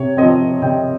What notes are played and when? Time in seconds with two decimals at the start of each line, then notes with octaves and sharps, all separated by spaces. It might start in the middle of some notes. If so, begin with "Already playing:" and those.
Already playing: C3 C#5
0.17 F3 C4 D#5
0.62 C3 G5